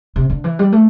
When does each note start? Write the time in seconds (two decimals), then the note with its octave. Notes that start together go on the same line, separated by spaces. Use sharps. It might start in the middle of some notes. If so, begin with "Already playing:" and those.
0.16 C3
0.30 D3
0.44 E3
0.59 G3
0.72 A3